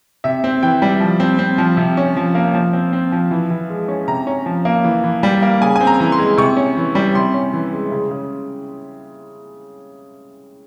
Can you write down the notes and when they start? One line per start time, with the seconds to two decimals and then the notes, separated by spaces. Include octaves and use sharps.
0.24 C3 E5
0.44 C4
0.63 E3 G5
0.82 G3
1.00 F3
1.20 C4
1.39 C4
1.58 F3
1.77 C3
1.97 C#4
2.16 F3
2.35 A#3
2.54 F3
2.73 C4
2.93 C4
3.12 F3
3.31 E3
3.50 E3
3.70 G#3
3.88 C#4
4.08 C3 A#5
4.27 C#4
4.46 F3
4.65 A#3
4.84 E3
5.04 E3
5.23 G3
5.42 A#3
5.61 C#3 G#5
5.76 C4 G#5
5.87 A#5
6.00 E3
6.12 C6
6.19 G#3
6.37 C3 C#6
6.57 C#4
6.77 E3
6.95 G3
7.15 C3 C6
7.34 C#4
7.53 E3
7.72 G#3
7.92 C#3
8.11 C#3